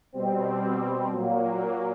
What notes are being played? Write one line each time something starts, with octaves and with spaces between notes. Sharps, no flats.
B2 G3 C4
A#2 F#3 A#3